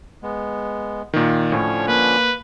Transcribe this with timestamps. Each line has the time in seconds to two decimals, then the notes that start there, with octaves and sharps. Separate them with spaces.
0.23 G#3 B3
1.13 A#2 D#3
1.52 A2 D3 F3 C#4 C#5
1.88 A#3 B4